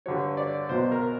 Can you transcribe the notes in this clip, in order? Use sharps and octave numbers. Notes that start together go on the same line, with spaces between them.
G2 D3 F#3 C#5
D5
B1 B2 F#3 C5
A#4